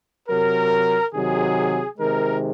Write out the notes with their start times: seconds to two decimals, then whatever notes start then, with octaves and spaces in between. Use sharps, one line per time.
0.29 C3 F#3 A#4
1.13 C3 D#3 F#3 G#4
1.98 C3 D#3 G#3 A#4